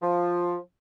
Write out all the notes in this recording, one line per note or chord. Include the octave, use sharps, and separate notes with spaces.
F3